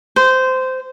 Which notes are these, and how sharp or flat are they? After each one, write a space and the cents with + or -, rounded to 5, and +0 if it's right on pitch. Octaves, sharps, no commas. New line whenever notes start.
C5 -15